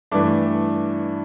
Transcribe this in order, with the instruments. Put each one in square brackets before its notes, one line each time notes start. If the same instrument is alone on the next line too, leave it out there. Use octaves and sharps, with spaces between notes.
[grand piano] G2 E3 A3 D4 D6